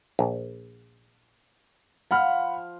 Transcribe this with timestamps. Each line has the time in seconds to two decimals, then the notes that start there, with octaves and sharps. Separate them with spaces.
0.19 A#1
2.11 F3 F#5 B5 F6